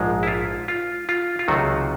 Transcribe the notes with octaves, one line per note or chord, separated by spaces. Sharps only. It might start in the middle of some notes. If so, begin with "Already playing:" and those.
Already playing: A#1 G#2 F3 G#3
E4
F4
F4
F4
F4
C#2 C3 D#3 F#3 A3 F#4